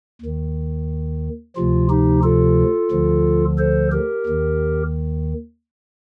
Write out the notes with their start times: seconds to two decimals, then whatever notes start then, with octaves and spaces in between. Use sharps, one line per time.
0.21 D#2 D#3
1.56 D2 C3 F3 F4
1.90 D#4 G4
2.23 F4 A4
2.91 D2 D3 F3
3.58 A4 C5
3.92 G4 A#4
4.26 D#2 D#3